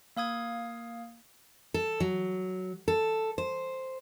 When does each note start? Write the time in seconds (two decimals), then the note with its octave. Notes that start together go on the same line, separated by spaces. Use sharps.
0.16 A#3 F5 D#6 G#6
1.74 A4
2.00 F#3
2.88 A4
3.38 C5